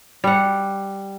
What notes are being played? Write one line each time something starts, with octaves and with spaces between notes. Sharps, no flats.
G3 F#5